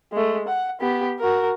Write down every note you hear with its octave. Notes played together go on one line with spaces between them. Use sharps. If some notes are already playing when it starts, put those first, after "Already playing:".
G#3 A3
F#5
B3 G4
F#4 A#4